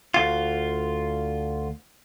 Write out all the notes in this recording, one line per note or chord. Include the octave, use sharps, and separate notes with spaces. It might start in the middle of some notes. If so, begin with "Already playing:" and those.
D2 F4